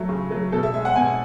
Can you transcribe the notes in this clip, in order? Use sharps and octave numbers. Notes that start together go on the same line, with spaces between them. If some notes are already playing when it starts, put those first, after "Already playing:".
Already playing: F#3 A3
C#3
F#3 A3
B2 A4
E5
G#3 E5
F#5
B2 G#5